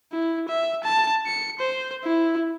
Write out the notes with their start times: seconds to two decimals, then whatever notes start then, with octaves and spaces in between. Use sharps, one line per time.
0.12 E4
0.48 E5
0.83 A5
1.26 C#7
1.60 C5
2.04 E4